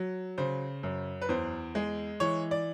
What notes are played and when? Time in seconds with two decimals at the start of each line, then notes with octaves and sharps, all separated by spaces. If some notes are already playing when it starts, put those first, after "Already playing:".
Already playing: F#3
0.38 C#3 C5
0.83 F#2
1.22 B4
1.29 E2 C5
1.75 G#3
2.20 E3 C#5
2.51 D5